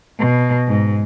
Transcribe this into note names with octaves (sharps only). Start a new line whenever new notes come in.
B2
G#2